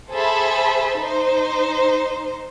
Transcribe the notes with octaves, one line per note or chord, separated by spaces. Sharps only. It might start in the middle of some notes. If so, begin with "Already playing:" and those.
G#4 A4 C5 E5 A5 B5
D#4 C5